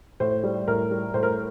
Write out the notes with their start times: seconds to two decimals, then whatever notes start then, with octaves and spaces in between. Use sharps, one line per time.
0.20 A2 C5
0.43 G3
0.68 A2 A#4
0.91 G3
1.14 A2 C5
1.23 A#4